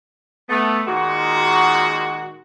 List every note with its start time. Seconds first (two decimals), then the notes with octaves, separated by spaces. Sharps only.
0.50 A3 B3
0.88 A#2 D#3 G#3 F#4